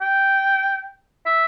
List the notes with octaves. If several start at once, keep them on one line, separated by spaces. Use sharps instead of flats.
G5
E5